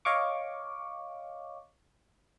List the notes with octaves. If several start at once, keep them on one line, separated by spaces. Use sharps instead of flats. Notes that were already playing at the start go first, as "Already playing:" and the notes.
C#5 D#5 F5 C#6 D6